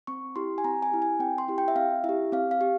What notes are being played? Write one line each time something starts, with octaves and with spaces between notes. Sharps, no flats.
C4 C#6
E4 G4 C6
G#5
C4 A#5
G#5
E4 G4
G#5
C4 G5
C6
E4 G4
G5
E5
C4 F5
E4 G4 E5
C4 F5
F5
G4